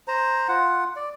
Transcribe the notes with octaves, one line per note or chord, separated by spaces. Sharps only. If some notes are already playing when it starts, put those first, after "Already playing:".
C5 A#5
F4 F#5
D5